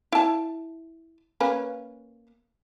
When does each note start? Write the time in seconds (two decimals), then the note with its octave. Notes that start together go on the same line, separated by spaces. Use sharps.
0.12 E4 A5
1.40 A#3 C#4 B4